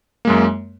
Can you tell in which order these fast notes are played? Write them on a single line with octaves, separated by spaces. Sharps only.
A#3 G#3 F#2